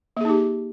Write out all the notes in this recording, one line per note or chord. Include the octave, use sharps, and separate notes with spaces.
A#3 D#4 G4 G#4